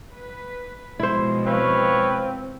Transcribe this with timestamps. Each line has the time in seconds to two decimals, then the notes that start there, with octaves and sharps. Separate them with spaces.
0.12 B4
0.99 B2 F3 G#3 E4 C5
1.46 C4 B4 C#5 F5